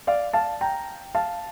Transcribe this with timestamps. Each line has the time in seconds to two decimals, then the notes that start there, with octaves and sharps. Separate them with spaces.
0.07 D5 F5
0.33 F5 A5
0.61 G5 A#5
1.15 F5 A5